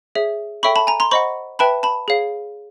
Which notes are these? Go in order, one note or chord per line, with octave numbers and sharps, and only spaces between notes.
G#4 C#5 E5
A4 C#5 E5 G5 B5 C#6
A5 B5
G#5 A#5
A#5 C6
C5 D#5 F#5 B5 C#6
B4 E5 G5 A5 B5
A5 B5
G#4 C#5 F5